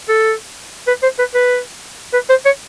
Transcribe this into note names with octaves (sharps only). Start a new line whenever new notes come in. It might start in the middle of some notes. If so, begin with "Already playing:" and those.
A4
B4
C5
B4
B4
B4
C5
C#5